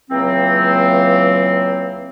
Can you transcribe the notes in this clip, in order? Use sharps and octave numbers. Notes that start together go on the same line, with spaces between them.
C#2 E3 F#3 A#3 C4